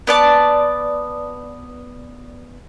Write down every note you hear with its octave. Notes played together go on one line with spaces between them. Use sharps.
B3 D5 A5